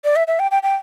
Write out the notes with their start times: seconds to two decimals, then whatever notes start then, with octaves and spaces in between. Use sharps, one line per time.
0.04 D5
0.16 E5
0.27 E5
0.39 G5
0.51 G5
0.63 G5